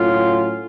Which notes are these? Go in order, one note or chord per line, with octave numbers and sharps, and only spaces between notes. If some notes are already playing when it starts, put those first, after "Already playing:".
Already playing: A2 F#3 C#4 F4